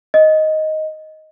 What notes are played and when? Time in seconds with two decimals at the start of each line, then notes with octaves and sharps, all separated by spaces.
0.14 D#5